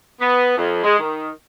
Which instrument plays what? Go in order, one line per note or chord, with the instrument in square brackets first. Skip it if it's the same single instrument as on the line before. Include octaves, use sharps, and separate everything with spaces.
[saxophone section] B3
F2
G#3
D#3